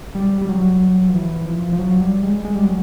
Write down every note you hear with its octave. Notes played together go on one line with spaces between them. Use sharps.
G3
G3
F#3
F3
E3
F3
F3
F#3
G3
G#3
G#3
G3
F#3